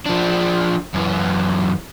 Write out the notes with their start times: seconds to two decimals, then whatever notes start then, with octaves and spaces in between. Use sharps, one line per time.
0.06 F3 D4
0.94 F#2 E3